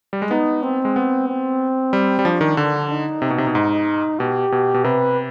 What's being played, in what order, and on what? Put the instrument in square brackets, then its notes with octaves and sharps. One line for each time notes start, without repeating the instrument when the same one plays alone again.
[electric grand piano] G3
G#3
[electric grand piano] B3 [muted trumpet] D#4
[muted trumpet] C4
[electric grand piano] G#3
B3
[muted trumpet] C4
[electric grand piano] G3
G3
[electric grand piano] F3 [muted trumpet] D4
[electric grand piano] D#3
D3
[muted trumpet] D#4
[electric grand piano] C3
B2
C3
B2
G#2
[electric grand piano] B2 [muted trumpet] G4
[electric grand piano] B2
B2
[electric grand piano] C3 [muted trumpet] B4